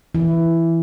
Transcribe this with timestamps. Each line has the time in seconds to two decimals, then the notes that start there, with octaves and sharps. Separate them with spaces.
0.15 E3 E4